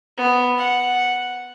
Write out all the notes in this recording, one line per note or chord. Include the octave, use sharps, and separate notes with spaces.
B3
F#5